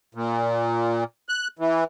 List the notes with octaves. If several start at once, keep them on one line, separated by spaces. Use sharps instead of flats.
A#2
F#6
E3